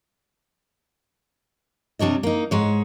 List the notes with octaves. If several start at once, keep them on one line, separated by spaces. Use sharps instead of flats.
C3 G3 D4 C#5 D#5
A#3 D#4
G#2 G#3 C#5